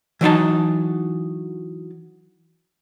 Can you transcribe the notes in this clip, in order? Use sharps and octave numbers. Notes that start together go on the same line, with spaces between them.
E3 F#3 D#4 A5